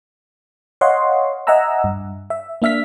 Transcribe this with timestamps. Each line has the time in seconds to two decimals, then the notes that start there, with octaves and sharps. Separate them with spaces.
0.81 C#5 D#5 F5 F#5 C6
1.47 D#5 E5 F#5 G#5 A#5 E6
1.84 G2
2.30 E5
2.62 A#3 D4 E5 F6 B6